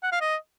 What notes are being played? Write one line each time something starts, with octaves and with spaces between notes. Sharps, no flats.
F#5
F5
D#5